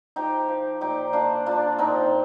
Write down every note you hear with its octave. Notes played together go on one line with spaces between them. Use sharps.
F3 D#4 G4
F3
A#2 D#4 G4
A#3 D4 F4
A#3 D4 F4
A#2 C4 D#4